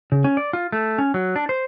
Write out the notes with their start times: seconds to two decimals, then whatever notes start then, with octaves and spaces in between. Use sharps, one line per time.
0.12 C#3
0.24 C#4
0.37 D5
0.53 F4
0.72 A3
0.98 C#4
1.14 F#3
1.36 D4
1.49 C5